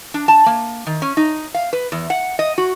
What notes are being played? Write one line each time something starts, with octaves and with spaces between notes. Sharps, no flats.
D4
A5
A#3
D#3
C#4
D#4
F5
B4
E2
F#5
D#5
F#4